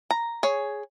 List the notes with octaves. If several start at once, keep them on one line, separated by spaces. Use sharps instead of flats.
A#5
G#4 C#5